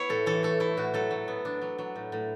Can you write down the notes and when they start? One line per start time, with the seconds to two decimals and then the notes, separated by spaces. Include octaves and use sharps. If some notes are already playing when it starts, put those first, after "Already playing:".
Already playing: B3 E4 C#5
0.09 A2 A4
0.26 E3 A4
0.43 A3 A4
0.60 E4 A4
0.77 A2 F#4
0.94 F#3 A4
1.11 F#3
1.28 B3
1.45 D4
1.62 F#3
1.78 F#3
1.96 A2
2.12 A2